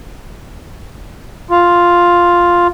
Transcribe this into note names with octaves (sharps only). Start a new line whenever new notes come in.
F4